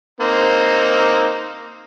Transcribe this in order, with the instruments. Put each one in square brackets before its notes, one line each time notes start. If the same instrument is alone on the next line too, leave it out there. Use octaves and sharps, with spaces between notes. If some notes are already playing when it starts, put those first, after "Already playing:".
[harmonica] A#3 C4 D#4